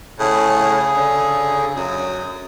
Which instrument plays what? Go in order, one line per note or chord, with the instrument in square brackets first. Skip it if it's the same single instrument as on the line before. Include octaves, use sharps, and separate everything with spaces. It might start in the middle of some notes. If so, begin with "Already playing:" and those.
[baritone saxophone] A2 [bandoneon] C#3 G#4
[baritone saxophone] D3
[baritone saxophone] F#2 [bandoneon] D#6